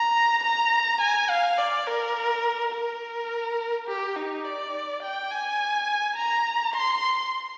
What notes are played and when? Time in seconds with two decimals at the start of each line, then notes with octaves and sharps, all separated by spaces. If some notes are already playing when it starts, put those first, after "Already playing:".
Already playing: A#5
0.43 A#5
1.01 G#5
1.30 F5
1.58 D5
1.87 A#4
2.73 A#4
3.88 G4
4.16 D#4
4.45 D5
5.02 G5
5.31 G#5
6.17 A#5
6.74 C6